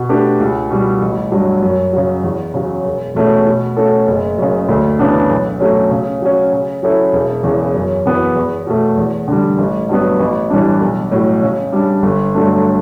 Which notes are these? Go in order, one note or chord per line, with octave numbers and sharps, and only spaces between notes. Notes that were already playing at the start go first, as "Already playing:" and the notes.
Already playing: B2
A3 D4 G4 B4
C#2
B2 G3
A1
G2 F#3
F#2
C#3 F#3
E2
C#3 F#3
E1
E2 B2 A3 C#4
B2
A3 C#4 F#4 A4
F#1
F#2 C#3
D2
C#3 E3 B3 D4
B1
B2 F#3 A3 C#4
C#3
F#3 C#4
C#3
F#3 C#4 E4 A4
E1
E2 C#3 E3
F#2
E3 B3 F#4 B4
E2
B2 A3
E2
D3 G3
A1
G2 F#3 B3
A1
A2 E3 G3 D4
B1
A2 F#3
C#3
G3 D4
G1
G2 F#3 A3 D4